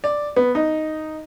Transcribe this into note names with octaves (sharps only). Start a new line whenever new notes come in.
D5
B3
D#4